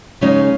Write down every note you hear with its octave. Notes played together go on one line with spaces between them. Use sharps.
C#3 G#3 D#4 C#5 F5